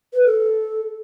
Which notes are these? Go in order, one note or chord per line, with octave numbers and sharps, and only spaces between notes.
B4
A4